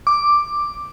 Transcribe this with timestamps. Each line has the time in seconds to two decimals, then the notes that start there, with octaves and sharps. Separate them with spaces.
0.07 D6